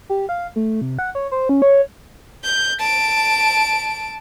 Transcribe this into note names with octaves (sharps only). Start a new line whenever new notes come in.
G4
F5
A3
C3
F#5
C#5
C5
C#4
C#5
G6
A5 D7